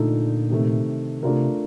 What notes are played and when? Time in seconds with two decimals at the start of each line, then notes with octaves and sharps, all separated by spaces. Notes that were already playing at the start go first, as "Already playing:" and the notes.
Already playing: A#2 D3 A3 D#4 A4
0.50 C3 D#3 A3
1.23 C3 A3 D4 F4 A#4